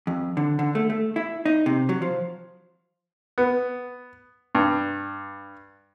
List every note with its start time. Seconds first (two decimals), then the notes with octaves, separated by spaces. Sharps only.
0.07 F2
0.37 D3
0.59 D3
0.75 A3
0.90 A3
1.16 E4
1.46 D#4
1.66 C3
1.89 F#3
2.02 F3
3.38 B3
4.55 G2